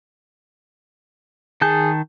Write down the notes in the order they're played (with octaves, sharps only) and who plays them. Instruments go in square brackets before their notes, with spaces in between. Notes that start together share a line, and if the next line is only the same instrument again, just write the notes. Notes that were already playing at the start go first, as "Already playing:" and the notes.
[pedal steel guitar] D#3 A5 G6 [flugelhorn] G#4